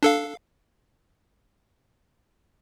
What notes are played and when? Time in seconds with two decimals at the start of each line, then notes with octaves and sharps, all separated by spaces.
0.03 D4 A4 F5